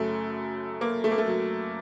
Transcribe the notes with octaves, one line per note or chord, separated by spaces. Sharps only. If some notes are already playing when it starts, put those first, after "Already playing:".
Already playing: F#2 C#3 A3
A#3
A3
A#3
A3
F#3